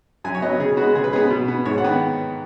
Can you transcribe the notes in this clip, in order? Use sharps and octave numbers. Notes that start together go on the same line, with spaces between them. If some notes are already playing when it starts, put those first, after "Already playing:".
F#2 G#5
C#5
F#3 B3 D#5
C#3 G#4
G#3 B3 F#4
C#3 G#4
B4
G#3 B3 G#4
B2
B3
G#2 C#5
F#5
D#3 B3